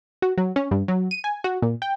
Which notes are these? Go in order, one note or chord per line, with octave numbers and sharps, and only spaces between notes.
F#4
F#3
C#4
G2
F#3
D#7
G#5
F#4
A#2
G5